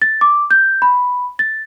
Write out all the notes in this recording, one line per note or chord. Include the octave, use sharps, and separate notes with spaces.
A6
D6
G6
B5
A6